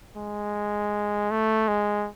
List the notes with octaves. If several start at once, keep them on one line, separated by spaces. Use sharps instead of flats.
G#3
A3
G#3